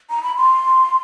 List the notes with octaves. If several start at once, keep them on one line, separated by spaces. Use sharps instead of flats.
A#5
B5
C6